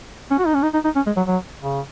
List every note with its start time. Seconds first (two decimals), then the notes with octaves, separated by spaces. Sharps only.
0.31 C#4
0.39 F#4
0.46 D#4
0.55 C#4
0.63 D#4
0.74 D#4
0.85 D#4
0.96 C#4
1.07 G#3
1.17 F#3
1.27 F#3
1.61 C#3